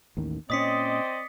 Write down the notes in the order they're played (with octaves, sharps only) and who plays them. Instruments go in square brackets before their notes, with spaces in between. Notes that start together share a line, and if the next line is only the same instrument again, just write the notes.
[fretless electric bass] A1 D#2 D#3
[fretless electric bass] A#2 C#4 [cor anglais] C4 [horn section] D5 D#5 [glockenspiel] D#6 B6 C#7